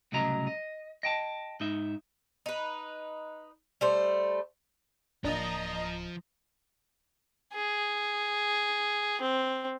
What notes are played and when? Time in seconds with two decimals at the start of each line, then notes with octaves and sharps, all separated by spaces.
0.12 C2 A2 C#3 F#3 D#5 A#5
0.47 D#5
1.03 D#5 G5 A5
1.60 G#2 D#4 E5
2.46 D#4 B4
3.81 G3 A3 C5
5.24 D1 F3 A#3 D4 F4 D#5 A#5
7.54 G#4
9.21 C4